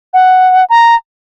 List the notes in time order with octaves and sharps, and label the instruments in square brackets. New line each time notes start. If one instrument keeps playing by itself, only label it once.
[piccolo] F#5
A#5